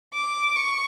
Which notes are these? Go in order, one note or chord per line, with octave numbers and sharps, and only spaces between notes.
D6
C#6